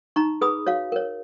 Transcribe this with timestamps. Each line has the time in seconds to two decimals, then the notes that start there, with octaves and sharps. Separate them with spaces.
0.16 D#4 A#5 C#6
0.41 G#4 B4 B5 D#6
0.67 F#4 C#5 F5
0.92 A#4 C#5